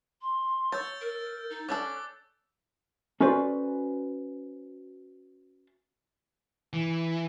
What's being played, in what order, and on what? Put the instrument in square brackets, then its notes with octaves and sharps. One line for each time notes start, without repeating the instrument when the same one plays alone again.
[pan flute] C6
[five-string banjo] C#5 [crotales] E6 G6 A6
[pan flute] A#4
D#4
[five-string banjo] C#4 D4 A4 [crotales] D6 A6 [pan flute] F#6
[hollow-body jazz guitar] C#4 F#4 A4 B4 C5 D5
[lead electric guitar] E3